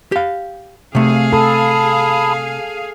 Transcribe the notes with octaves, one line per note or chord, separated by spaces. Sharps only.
G4 F5
C3 A3 G#4 F5
A4 A5 B5 D#6